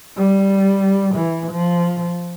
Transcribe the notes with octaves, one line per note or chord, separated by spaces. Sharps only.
G3
E3
F3